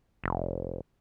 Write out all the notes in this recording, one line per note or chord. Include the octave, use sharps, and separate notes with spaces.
F1